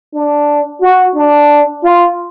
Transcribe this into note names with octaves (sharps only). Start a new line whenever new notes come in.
D4
F#4
D4
F4